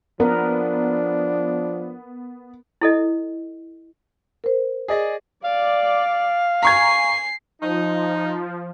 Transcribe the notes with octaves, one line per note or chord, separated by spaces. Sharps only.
F3 B3 D4 A#4
E4 A4 D#5
A#4 C5
G#4 D5 D#5
D5 F5
G#5 A#5 C#6 G#6 C7
F3 D#4